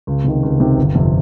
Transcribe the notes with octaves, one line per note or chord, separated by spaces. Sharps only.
C#2
C3 D#3
C#2
C3 D#3
G1
F2 C3